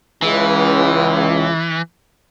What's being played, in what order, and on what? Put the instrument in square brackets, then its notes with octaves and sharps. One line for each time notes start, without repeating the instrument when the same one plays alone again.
[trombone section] C#2 [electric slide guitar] E3